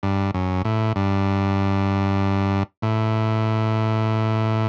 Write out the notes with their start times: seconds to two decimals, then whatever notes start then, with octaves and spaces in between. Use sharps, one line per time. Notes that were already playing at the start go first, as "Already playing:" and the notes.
0.03 G2
0.34 F#2
0.65 A2
0.96 G2
2.82 A2